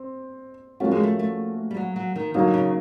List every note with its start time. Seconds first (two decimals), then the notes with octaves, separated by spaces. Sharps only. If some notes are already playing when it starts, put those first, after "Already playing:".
Already playing: C4
0.80 F3 A3 A#3 C#4 F#4
0.91 G#3
1.03 A3
1.19 A3
1.71 G3
1.77 F#3
1.96 F#3
2.16 D#3
2.34 D3 F#3 A#3 D#4
2.54 C#3